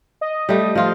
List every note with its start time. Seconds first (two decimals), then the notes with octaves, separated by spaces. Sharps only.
0.21 D#5
0.49 G3 A3
0.75 F3 F4